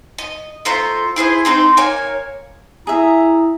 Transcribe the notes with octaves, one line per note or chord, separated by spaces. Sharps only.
D#5
A3 F4 C5 A#5
E4 G#4 C5 D#6
C4 D#4 C5
A#3 A#4 C#5 G#5
E4 G#4 E5 A#5